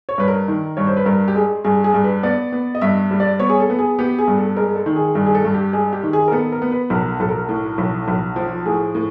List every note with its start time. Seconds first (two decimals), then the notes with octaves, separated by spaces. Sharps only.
0.09 C#5
0.18 G2 B4
0.28 A#4
0.48 D#3
0.77 G2 C#5
0.87 C5
0.97 B4
1.06 G2 A#4
1.28 G4
1.35 G#3 G#4
1.64 G2 G#4
1.84 G#4
1.94 G2
2.04 B4
2.23 B3 D5
2.52 B3
2.75 D#5
2.81 G2 E5
3.11 G3
3.20 D5
3.40 B3 C#5
3.49 G#4
3.60 A4
3.70 B3
3.79 G#4
3.99 B3 G4
4.19 G#4
4.28 G2
4.38 A4
4.57 G#3 A#4
4.76 A4
4.86 D#3
4.96 G#4
5.15 G2 G#4
5.26 G#4
5.35 A4
5.45 G2
5.54 G4
5.73 G#3 G#4
5.93 G4
6.03 D#3
6.13 G#4
6.28 A#4
6.32 B3 A4
6.52 A#4
6.62 B3
6.72 B4
6.90 B1 A#4
7.20 B1 A4
7.29 A#4
7.49 A2
7.78 B1
8.08 B1
8.36 F3
8.65 A2 G#4
8.95 A2